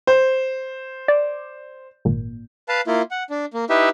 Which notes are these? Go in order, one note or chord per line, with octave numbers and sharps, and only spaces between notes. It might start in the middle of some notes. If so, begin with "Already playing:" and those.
C5
D5
G#1 A#2
B4 F5 A5
A#3 E4 F4
F#5
D4
A#3
D#4 E4 G4 B4 E5